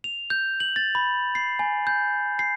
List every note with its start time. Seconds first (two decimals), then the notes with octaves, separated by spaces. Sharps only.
0.04 F7
0.30 G6
0.60 F#7
0.76 A6
0.95 B5
1.35 C7
1.59 G#5
1.87 G6
2.39 C7